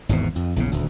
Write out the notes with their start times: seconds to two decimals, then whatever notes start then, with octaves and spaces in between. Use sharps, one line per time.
0.09 G#1 E2 G#2 B2
0.36 F2
0.56 A#1 E2 C#3
0.72 D#1 D2